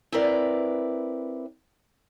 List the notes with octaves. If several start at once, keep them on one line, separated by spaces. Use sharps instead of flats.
C4 E4 A#4 B4 D5